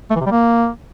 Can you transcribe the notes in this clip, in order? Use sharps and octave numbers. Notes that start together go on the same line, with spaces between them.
A3
E3
C3
G3
A#3